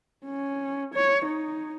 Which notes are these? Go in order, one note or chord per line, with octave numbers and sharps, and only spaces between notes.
C#4
C#5
D#4